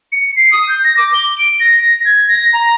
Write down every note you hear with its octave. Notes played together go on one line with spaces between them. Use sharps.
C#7
C7
D#6
G6
A#6
D6
G7
D7
A#6
G#6
A#6
A#5